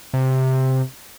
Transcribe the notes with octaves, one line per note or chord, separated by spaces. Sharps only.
C3